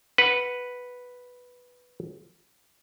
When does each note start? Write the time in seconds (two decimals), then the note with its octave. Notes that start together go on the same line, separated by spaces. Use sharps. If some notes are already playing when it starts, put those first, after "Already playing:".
0.18 B4 F#5